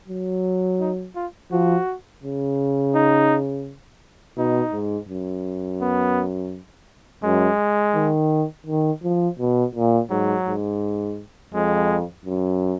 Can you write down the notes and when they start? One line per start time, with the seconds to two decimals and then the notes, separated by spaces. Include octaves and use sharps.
0.08 F#3
0.80 D#4
1.16 F4
1.51 F3 F#4
2.23 C#3
2.94 D#4
4.37 B2 D#4
4.73 G#2
5.09 F#2
5.81 B3
7.24 F#2 G#3
7.95 D#3
8.67 D#3
9.03 F3
9.39 B2
9.75 A#2
10.10 G#2 F#3
10.46 G#2
11.54 F2 G#3
12.25 F#2